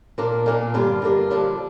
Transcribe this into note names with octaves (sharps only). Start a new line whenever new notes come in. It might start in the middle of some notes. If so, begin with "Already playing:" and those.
A#2 A#3 D4
A#2 A#3 D4
G2 D3 A#3 F4
G2 D3 A#3 F4
G2 D3 F3 D4